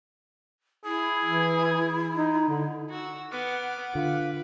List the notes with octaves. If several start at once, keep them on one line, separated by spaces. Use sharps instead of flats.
E4 G#4
E3
D#4
D3
F#4 E6
B3 F#5 D6 F6
D3 F4 B4